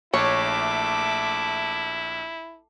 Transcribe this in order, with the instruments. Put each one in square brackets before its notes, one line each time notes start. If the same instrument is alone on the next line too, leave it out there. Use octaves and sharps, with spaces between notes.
[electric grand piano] A#1 [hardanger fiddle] A3 D6 [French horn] E4 [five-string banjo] C#5